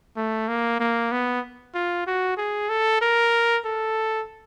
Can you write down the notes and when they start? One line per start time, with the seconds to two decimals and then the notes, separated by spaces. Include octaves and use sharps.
0.16 A3
0.48 A#3
0.80 A#3
1.11 B3
1.74 F4
2.07 F#4
2.37 G#4
2.69 A4
3.01 A#4
3.65 A4